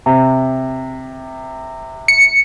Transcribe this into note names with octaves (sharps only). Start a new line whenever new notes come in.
C3
C#7